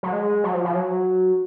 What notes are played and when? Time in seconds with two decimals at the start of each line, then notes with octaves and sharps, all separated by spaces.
0.03 F#3
0.13 G#3
0.44 F#3
0.54 F3
0.65 F3
0.75 F#3